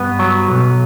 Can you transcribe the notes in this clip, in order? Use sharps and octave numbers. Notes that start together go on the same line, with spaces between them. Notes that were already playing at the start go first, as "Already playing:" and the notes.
Already playing: G2 B3
F#3
B1